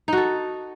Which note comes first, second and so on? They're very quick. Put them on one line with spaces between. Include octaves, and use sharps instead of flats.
D#4 F#4 A4